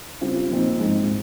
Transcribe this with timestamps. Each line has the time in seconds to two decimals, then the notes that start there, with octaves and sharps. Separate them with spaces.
0.21 C#3 G3 C4 F4
0.50 A#2 F3 C4 D#4
0.79 G#2 F3 G#3